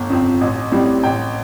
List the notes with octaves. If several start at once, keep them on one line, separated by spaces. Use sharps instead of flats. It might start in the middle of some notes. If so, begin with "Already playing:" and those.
Already playing: G1
F2 F3 C4
A1
A2 G3 C4
A1 G5